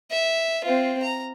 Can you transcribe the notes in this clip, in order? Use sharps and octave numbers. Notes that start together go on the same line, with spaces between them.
E5
C4 F4
A#5